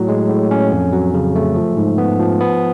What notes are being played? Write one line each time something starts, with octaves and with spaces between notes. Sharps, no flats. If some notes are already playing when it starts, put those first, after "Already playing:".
Already playing: A2 F#3
G#3
A2
C#4
F2
F#3
C#3
A3
F3
G#2
B3
F3
B3